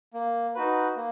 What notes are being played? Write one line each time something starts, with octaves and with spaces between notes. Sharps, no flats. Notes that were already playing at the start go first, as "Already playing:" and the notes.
A#3
D#4 F#4 B4
A#3